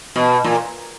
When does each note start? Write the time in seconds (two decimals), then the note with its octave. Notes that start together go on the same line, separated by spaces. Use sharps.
0.16 B2
0.44 A#2